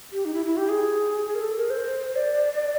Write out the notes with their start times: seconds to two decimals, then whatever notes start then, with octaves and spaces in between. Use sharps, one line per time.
0.12 G4
0.25 D#4
0.34 E4
0.46 E4
0.57 G4
0.69 G#4
1.26 G#4
1.35 A#4
1.40 A4
1.55 A#4
1.70 C5
2.16 D5